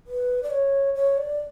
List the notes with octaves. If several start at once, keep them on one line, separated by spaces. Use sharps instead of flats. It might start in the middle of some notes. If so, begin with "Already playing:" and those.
B4
D5
C#5
C#5
D5